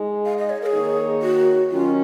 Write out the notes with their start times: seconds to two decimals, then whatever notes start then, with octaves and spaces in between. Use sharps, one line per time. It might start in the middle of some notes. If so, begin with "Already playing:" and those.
Already playing: G#3 D#4 G#4
0.25 F5
0.38 D#5
0.50 C#5
0.62 A#4
0.66 G#4
0.73 D#3 A#3 D#4 A#4 C#5
1.22 F#4
1.71 D#3 F#3 C#4 F4